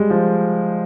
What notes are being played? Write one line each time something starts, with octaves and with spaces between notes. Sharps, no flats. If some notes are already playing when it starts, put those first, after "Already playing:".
Already playing: G3 G#3
F3